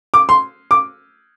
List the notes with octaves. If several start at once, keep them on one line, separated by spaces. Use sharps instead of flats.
D6
C6
D6